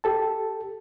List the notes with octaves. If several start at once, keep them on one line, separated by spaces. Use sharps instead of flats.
G4 A4 A5